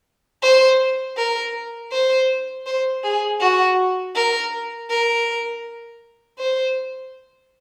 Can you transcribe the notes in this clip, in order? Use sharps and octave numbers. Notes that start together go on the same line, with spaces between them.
C5
A#4
C5
C5
G#4
F#4
A#4
A#4
C5